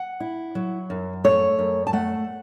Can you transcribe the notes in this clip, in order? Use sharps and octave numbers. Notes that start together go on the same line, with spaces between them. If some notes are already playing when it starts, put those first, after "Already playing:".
Already playing: F#5
E4
F#3
F#2
A3 C#5
F#2
A5
A3 F#5